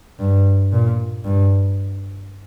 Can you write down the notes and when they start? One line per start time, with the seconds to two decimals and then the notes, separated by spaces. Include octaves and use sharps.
0.20 G2
0.73 A#2
1.24 G2